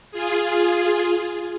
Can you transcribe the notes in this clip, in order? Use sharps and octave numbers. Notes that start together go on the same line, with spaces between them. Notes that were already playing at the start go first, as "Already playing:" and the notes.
F4 G#4